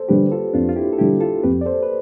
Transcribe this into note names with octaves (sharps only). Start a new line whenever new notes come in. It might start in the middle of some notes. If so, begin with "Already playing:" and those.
Already playing: A4 C5
D3 G3 G4 B4
F4 A4
F2 D4 F4
F4
E4 G4
A4
D3 G3 E4 G4
F4 A4
F2 G4 B4
D5
A4 C5
B4